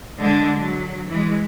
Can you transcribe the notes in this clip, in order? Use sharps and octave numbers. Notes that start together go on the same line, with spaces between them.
D3 G#3 D4
F#3
E3 G#3